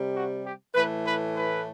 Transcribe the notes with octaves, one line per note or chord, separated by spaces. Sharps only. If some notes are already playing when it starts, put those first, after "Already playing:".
Already playing: C3 G3
F#4
G4
A2 E3 A3 B4
B4
B4